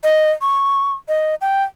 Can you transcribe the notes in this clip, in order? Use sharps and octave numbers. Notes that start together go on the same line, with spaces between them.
D#5
C#6
D#5
G5